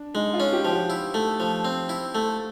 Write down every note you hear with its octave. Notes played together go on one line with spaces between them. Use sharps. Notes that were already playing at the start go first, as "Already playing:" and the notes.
Already playing: D4
G#3 D#4
F4
C#4
G4
F3 G4
F#4
E4
A3
F3
C4
E4
A3